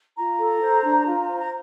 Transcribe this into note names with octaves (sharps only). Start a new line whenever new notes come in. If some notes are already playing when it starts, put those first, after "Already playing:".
F4 A#5
A4
C5
D4
F4
C5
A#5